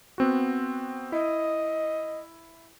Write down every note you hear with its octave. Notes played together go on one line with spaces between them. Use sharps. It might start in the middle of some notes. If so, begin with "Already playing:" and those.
B3 C4 F#4
E4 D#5